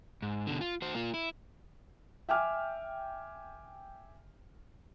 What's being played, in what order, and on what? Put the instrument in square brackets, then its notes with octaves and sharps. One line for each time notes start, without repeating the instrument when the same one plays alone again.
[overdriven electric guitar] G#2
B2 D3
F4
F#4 C5
A#3 F4
E4
[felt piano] E5 G5 G#5 D6 F6